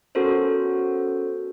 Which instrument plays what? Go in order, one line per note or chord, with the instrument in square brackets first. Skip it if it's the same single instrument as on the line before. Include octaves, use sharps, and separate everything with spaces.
[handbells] B3 C#4 F#4 A4 A#4 C5